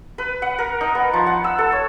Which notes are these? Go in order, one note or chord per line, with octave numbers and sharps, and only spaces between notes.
B4
F#5
A#4
D#4
B3
F3
F#5
E6
A4
C#5